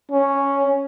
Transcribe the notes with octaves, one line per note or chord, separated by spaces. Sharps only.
C#4